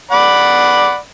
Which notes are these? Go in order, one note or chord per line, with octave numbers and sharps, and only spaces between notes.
D5 F#5 B5